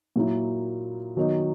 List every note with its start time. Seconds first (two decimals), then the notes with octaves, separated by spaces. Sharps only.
0.16 A#2 F#3 A#3 E4
1.16 D#3 F#3 B3 D#4